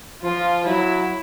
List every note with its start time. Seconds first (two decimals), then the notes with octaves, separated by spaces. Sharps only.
0.22 F3 F4
0.66 F#3 E4